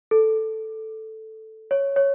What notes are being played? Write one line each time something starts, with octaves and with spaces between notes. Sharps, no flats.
A4
C#5
C#5